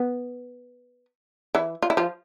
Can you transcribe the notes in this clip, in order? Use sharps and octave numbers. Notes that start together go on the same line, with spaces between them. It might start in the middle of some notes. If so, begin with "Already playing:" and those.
Already playing: B3
E3 E4
F4
E4
F3 F4